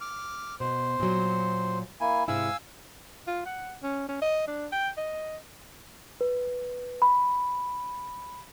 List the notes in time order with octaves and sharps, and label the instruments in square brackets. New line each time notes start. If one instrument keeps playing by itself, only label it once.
[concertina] D6 F6
[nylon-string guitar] B2 [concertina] C5
[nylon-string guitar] A#2 F#3
[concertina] A#3 E4 G#5
[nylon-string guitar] G#2 C3 E4 [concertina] F5 G#5 E6
[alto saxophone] F4
F#5
C#4
C#4
D#5
D4
G5
D#5
[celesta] B4
B5